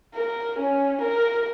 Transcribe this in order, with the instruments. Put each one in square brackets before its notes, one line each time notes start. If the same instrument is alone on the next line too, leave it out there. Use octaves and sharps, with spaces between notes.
[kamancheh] A#4
C#4
A#4